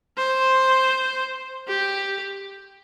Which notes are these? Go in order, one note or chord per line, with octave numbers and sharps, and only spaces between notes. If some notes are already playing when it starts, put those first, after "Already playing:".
C5
G4